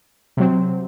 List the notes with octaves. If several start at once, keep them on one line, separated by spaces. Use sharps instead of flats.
C3 F#3 C4